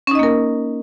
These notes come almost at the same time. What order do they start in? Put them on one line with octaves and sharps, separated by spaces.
C#4 D#4 D#5 A#3 A#4